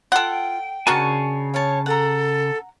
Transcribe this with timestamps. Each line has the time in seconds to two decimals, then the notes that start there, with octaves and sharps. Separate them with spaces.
0.12 F4 A4 F#5 G5
0.87 C#3 D4 F#4 A#4 C#5 G#5 A5
1.54 C#5 F5 A5
1.86 A4 F#5 A#5